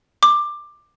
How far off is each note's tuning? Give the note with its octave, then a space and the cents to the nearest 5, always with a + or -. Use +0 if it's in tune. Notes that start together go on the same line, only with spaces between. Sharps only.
D6 +15